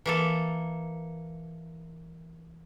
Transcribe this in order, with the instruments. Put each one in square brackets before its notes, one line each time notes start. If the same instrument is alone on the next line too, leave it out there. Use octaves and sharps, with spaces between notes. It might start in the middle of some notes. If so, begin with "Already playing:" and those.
[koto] E3 A#3 A4